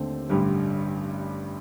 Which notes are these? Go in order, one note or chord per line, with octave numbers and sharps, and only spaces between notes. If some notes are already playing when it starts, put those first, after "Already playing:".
Already playing: D#2 D3 A3 C4
A1 G2 D3 G3